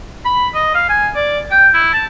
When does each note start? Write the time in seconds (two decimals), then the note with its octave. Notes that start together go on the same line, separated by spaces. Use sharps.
0.25 B5
0.55 D#5
0.74 F5
0.89 G#5
1.15 D5
1.50 G5
1.74 E4
1.93 A5